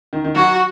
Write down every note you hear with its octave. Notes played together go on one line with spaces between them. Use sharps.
D#3
D#3
F#3 F#4